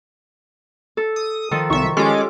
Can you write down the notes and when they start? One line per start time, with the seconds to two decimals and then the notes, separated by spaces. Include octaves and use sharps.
0.97 A4
1.16 D#6
1.51 D#3 F3 A4
1.70 C2 E5 C#6
1.97 G#3 C#4 F4 G4 A4 D6